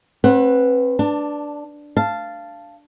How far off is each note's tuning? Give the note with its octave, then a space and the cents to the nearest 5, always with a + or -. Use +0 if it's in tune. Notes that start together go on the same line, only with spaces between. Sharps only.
C4 +35 B4 +0 F#5 +0
D4 +0 A5 +25
F5 -15 A5 +0